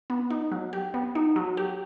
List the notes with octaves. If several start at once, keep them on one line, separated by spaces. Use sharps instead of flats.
B3
D#4
F#3
G4
B3
D#4
F#3
G4